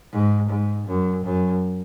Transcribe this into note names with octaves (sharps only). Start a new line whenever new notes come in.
G#2
G#2
F#2
F#2